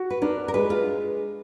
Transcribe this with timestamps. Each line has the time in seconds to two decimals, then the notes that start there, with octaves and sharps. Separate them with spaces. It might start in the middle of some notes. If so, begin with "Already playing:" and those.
Already playing: F#4
0.10 B4
0.22 D4 A#4
0.48 A#4
0.54 G#3 B4
0.70 F4